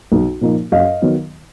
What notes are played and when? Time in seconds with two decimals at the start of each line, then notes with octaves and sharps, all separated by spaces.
0.12 B1
0.41 A#2 F3 A#3 D#4
0.72 F#2 D#5 F5
1.02 D#3 F#3 B3